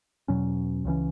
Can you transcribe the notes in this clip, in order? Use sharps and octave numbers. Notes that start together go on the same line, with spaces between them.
E2 B2 F#3 C#4
C#2 C#3 E3 C#4